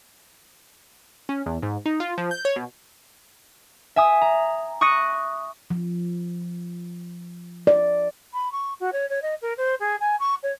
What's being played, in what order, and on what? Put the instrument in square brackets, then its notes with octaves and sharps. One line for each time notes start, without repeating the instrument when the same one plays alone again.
[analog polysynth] C#4
E2
G#2
D#4
F4
F3
G6
C#5
B2
[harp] E5 G#5 D#6
A#5
C#6 D#6 F#6 A#6 C#7 D#7
[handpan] F3
D5
[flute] B5
C#6
F#4
C#5
C#5
D#5
A#4
C5
G#4
G#5
C#6
C#5